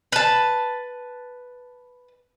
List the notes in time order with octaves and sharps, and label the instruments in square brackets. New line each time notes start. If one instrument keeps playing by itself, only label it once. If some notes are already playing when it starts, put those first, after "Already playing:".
[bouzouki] B4 A5